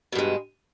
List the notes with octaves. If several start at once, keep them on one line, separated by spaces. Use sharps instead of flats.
G2 B2 G#3